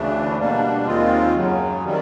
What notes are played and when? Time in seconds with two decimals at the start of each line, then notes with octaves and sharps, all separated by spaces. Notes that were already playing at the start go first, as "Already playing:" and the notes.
Already playing: D2 C#3 E3 A3 D4
0.38 B2 G3 A#3 D4
0.86 D#2 D#3 G#3 C4 F4
1.35 F#2 C#3 F#3
1.84 C3 D#3 G3